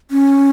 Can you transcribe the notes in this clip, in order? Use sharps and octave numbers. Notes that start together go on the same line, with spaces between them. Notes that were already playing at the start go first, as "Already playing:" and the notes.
C#4